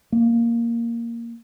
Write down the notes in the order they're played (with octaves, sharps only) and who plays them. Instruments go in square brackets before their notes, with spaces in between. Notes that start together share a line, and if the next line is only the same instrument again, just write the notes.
[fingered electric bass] A#3